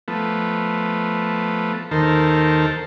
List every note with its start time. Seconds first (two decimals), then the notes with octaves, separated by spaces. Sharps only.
0.08 F3 A3 B3
1.91 D#2 D#3 A4 A#4 C5